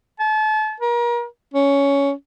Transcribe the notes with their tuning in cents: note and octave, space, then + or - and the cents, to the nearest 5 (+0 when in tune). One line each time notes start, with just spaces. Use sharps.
A5 -35
A#4 +35
C#4 +10